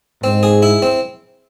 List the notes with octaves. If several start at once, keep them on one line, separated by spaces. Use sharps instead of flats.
G#2 C4
G#4
E4
C4